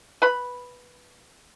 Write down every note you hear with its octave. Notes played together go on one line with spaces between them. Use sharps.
B4 B5